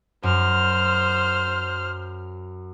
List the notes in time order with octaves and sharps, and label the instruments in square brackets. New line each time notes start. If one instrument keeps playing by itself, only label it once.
[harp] F#2 [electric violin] C5 F6